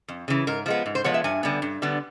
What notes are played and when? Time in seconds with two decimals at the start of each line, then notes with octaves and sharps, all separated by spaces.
0.08 F2
0.28 C#3 E3
0.47 G#2 A#4
0.66 F3 G#3 B3
0.86 G#2
0.95 C5
1.04 F3 G#3 B3 C#5
1.14 E5
1.24 G2 G#5
1.43 D3 G3 B3
1.62 G2
1.82 D3 G3 B3